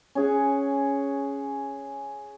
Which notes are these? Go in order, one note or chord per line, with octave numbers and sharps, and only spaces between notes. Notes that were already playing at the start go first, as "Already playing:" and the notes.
C#4 G#4 F#5